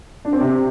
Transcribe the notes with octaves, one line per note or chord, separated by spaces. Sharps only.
D4
C4
C3